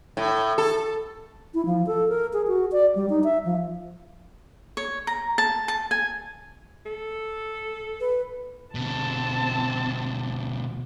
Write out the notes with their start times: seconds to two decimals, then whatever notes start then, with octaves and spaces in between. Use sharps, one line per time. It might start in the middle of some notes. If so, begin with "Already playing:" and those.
0.17 A2
0.58 A4
1.54 E4
1.66 F3
1.87 A4
2.09 A#4
2.33 G#4
2.47 F#4
2.72 D5
2.95 G3
3.10 D#4
3.24 E5
3.45 F3
4.77 C#5
5.07 A#5
5.38 A5
5.68 A5
5.91 G#5
6.86 A4
8.00 B4
8.75 B2 D3 C4 A5